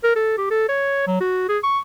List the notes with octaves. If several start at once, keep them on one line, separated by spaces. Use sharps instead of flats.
A#4
A4
G4
A4
C#5
F#3
F#4
G#4
C#6